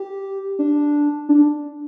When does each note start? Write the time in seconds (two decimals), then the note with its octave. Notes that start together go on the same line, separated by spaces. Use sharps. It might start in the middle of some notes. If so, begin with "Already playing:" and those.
Already playing: G4
0.59 D4
1.29 D4